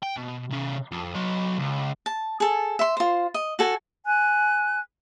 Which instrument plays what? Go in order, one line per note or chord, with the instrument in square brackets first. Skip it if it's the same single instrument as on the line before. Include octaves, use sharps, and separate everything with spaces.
[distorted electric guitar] G5
B2
C3 C#4
F2
F#3 D#5
C#2
[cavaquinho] A5
G#4 A4
E5 C6
F4 C5
D#5
F#4 A4 G#5
[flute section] G#5 F#6